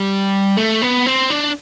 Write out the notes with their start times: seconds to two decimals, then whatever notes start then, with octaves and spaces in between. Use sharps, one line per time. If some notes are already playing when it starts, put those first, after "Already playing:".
Already playing: G3
0.57 A3
0.82 B3
1.06 C4
1.30 D4